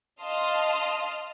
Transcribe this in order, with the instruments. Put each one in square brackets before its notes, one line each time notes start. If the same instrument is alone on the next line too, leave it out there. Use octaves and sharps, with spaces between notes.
[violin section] D#5 F5 A5 C6 D#6 F6